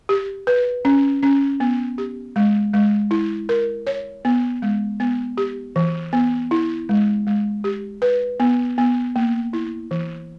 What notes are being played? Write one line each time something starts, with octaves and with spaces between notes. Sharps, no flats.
G4
B4
C#4
C#4
B3
G4
G#3
G#3
E4
A#4
C#5
B3
G#3
B3
G4
E3
B3
E4
G#3
G#3
G4
B4
B3
B3
A#3
E4
E3